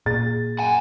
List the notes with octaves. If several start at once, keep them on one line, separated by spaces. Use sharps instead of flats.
A#2 G#4 A6
F#5 G#5